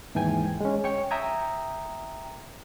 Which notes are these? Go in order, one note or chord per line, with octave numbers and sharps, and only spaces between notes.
D#2 G#2 E3 G5 G#5 G#6
G#3 C#4
C#5 G5 C#6
E5 G5 A#5 D#6 G#6